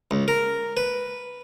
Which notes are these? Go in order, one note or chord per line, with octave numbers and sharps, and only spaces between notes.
C#2
A#4
B4